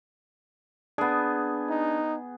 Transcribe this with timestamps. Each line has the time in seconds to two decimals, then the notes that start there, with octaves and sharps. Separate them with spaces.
0.98 B3 D4 G#4
1.69 D#4